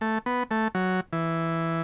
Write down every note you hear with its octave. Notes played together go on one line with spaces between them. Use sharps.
A3
B3
A3
F#3
E3